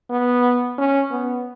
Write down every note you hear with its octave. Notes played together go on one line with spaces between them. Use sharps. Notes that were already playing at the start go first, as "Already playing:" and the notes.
B3
C#4
B3